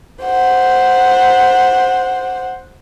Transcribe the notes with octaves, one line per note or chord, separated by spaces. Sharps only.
C5 F#5